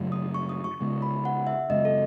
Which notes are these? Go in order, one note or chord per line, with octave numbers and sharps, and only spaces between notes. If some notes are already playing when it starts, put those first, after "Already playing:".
Already playing: F#2 C#3 F#3 A3
D#6
C#6
D#6
C#6
C#3 G#3 B3
B5
F#5
E5
F#2 C#3 G#3 D#5
A4